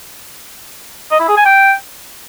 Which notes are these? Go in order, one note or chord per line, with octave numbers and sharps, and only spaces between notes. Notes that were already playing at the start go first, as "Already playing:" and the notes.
D#5
E4
G#4
G#5
G5